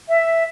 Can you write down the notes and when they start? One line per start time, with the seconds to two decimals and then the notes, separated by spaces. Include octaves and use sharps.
0.08 E5